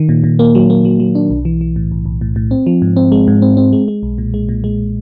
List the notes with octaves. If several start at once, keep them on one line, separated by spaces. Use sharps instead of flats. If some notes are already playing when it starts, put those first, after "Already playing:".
Already playing: D#3
A#2
A#2
A#3
F#3
A#3
F#3
F#3
D4
B1
E3
E3
A2
B1
B1
A2
A2
C4
F3
G#2
C4
G#3
G#2
C4
C4
G#3
G#3
B1
A#2
G#3
A#2
G#3